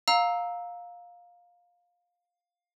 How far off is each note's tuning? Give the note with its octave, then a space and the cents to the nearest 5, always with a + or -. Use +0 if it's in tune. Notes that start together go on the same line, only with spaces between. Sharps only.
F5 +15 A#5 +0 E6 -15